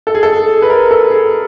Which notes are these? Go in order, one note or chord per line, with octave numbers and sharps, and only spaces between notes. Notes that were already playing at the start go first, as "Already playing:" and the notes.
A4
G#4
A4
B4
A#4
A4
G#4